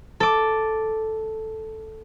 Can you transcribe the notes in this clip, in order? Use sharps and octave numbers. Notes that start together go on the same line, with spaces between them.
A4 D6